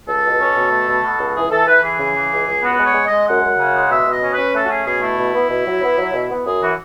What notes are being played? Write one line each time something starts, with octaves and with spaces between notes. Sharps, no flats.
C#2 A4
B2
C#4
B2
A3
B2
B2
C#2
E3 G#4
E3 A4
E3 B4
E3 G#4
C#3
E3
C#2
C#2
B3 F#4
G#3
C#5
G#3
D#5
G#3
F#2 F#5
F#2
C#3
G#3
B2 E5
B2
D#5
C#4
C#4 B4
A3 A4
F#4
C#4 G#4
B2 G#4
A3 E4
B2
B3
B2
F#3
B3
F#3
B2
B3
F#2 G#4
E3 F#4